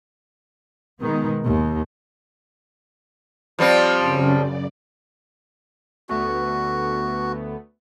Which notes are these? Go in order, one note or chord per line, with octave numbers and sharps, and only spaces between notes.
B2 D#3 G#3 B3
D#2
F3 G3 C4
F#2 C#3
D5
D2 A3 B3 F#4